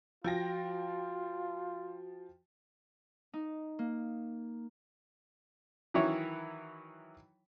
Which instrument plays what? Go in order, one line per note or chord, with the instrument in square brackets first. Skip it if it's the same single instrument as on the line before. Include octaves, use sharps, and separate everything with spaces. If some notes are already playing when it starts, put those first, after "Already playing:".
[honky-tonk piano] F3 G5 A#6 [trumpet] F4 [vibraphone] F#4
[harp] D#4
A#3
[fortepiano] D#3 E3 F#3 E4 C#5